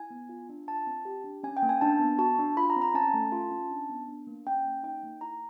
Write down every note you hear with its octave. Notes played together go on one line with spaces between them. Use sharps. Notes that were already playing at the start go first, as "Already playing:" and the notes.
Already playing: E4 G#5
B3
F4
D4
F4 A5
C4
G4
D4
C#4 G#5
G5
A#3
G#5
D4 A5
B3
F#4 A5
D4
F4 B5
A#5
C4
A#5
C#4 A5
A3
F4
C#4
D4
B3
D4
A#3
C#4 G5
A#3
D#4 G5
A#3
E4 A#5